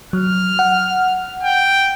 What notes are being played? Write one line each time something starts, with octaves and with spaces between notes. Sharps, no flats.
F#3 F6
F#5
G5